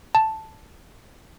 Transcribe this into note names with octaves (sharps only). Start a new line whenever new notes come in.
A5